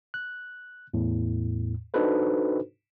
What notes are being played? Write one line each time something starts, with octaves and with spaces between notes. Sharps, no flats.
F#6
E2 A2
D4 D#4 F#4 A4 B4 C5